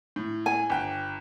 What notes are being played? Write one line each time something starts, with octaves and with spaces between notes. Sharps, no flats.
A2
G#5
G1 G5